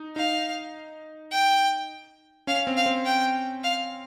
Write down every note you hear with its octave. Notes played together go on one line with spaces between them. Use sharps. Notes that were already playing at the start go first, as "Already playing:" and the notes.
Already playing: D#4
D#4 F5
G5
C#4 F5
C4
F5
C4
G5
F5